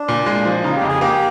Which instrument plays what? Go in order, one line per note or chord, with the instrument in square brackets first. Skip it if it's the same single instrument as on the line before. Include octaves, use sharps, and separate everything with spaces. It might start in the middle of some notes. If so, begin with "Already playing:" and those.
Already playing: [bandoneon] D4
[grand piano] A#2
G#3
F3
[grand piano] C#3 [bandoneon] D#4
[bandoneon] G4
[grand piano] F2
[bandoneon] G#4
[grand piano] A#3 [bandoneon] G4